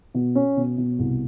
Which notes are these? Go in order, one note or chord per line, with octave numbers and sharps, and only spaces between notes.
B2
C#4
B2
B2
C2